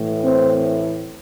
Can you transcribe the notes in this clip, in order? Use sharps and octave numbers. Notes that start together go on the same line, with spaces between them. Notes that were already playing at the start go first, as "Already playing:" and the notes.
Already playing: A2 E3
C4